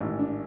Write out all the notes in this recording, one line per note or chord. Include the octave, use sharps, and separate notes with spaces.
A1 G#2 D#3
D4